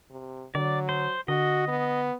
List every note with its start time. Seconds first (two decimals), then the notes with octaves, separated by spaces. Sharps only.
0.10 C3
0.55 D3 F#3 D5
0.89 C5
1.28 D3 F#4 D#5
1.68 B3